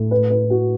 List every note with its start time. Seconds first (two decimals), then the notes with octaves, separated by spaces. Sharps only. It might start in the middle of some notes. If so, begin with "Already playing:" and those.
Already playing: A2 A3
0.11 B4
0.30 B4
0.50 F#4